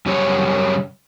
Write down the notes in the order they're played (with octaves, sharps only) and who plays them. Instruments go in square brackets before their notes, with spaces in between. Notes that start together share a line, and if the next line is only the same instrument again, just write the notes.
[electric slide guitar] F#2 C#3 G3 C#4 F4 C#5